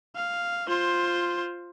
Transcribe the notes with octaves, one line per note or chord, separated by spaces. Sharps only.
F5
F4 C5